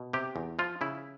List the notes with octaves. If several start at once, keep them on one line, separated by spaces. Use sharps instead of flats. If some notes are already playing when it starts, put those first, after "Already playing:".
Already playing: B2
C3 G4
E2
F3 F4
C#3 E4